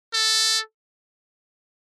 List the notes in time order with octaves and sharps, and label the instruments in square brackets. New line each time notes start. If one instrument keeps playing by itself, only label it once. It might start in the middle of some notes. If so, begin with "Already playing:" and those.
[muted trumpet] A4